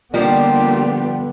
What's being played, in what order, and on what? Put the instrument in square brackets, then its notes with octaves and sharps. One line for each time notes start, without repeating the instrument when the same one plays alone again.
[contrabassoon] A#2 [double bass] D3 B3 [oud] F3 G3 [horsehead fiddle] D4 G4